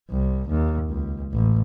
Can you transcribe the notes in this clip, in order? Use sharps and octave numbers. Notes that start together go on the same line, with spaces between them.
C2
D#2
C#2
A1